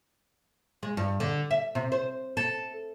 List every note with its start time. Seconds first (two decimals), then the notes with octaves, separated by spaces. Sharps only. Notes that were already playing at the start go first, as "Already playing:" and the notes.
0.83 G#3
0.97 G2
1.20 D3
1.51 E5
1.75 C3
1.92 C5
2.37 A4